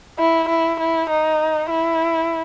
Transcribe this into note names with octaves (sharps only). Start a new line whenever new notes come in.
E4
E4
E4
D#4
E4